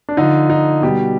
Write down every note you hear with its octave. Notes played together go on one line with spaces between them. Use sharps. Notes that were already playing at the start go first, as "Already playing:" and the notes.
D4
D3 F3 D#4
D#4
B2 G3 G4